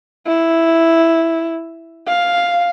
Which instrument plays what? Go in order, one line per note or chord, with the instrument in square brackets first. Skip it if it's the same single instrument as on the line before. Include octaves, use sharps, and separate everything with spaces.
[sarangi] E4
F5